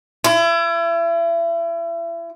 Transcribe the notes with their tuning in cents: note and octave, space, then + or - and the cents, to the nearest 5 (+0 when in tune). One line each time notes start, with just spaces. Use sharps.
E4 +35